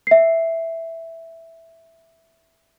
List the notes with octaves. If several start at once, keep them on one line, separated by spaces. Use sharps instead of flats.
E5 C7